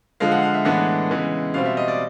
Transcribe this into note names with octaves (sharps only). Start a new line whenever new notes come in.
D3 F3 G#3 F5
F#5
F5
E5
A2 E3 G#3 B3 D4 F#5
C#3 E3 G#3 B3
B2 G3 C4 F5
E5
D#5
D5